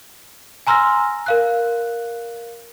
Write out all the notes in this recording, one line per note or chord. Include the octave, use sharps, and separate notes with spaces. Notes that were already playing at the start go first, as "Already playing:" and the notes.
G#5 A#5 C6 E6 F6 A#6
A#4 F5 F#6